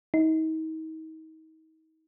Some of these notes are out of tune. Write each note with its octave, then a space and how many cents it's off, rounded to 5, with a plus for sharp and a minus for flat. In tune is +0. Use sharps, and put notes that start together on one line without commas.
D#4 +35